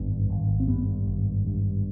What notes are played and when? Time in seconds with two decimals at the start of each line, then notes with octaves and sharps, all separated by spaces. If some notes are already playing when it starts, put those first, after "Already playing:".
Already playing: G#1 G2 B3
0.30 G#1
0.60 C4
0.67 G2 B3
1.07 G#1
1.47 G2